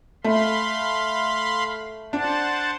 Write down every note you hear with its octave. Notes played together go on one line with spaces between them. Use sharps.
A3 F5 B5 C6
D4 C5 F#5 A5